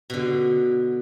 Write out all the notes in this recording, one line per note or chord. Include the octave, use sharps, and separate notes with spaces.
B2 D3